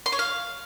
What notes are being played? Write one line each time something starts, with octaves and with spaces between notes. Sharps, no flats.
C6
C#5
F5